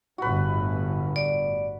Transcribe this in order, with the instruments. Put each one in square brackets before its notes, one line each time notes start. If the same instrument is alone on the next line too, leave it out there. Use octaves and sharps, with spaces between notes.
[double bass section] G1 A2 [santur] F#4 B4
[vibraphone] D5